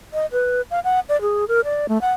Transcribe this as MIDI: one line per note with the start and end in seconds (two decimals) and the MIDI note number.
0.14 0.26 75
0.32 0.62 71
0.71 0.80 77
0.84 1.00 78
1.09 1.20 74
1.22 1.45 68
1.48 1.61 70
1.65 1.86 74
1.89 2.01 57
2.01 2.13 78